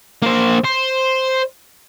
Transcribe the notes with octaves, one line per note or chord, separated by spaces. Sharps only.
A#3 C5
C5